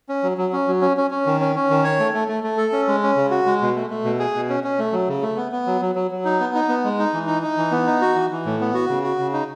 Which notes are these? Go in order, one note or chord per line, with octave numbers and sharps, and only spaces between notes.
C#4
F#3
F#3
C#4
F#3
C#4
C#4
C#4
D#3
C#4
C#4
D#3
C#5
A3
A3
A3
A3
A4
C#4
G#3
C#4
C#3
F#4
G#3
B2
A3
A3
B2
G#4
B2
C#4
C#4
A3
F#3
C#3
A3
B3
B3
F#3
F#3
F#3
F#3
D#4
B3
D#4
B3
G#3
D#4
E3
D#4
D#4
E3
B3
D#4
F#4
E3
E3
A2
B3
F#4
C#3
F#4
C#3
D#4